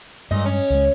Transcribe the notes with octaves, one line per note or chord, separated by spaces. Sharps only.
G2 A#2 G3 G#3 D#5
C#4
C#2 G#3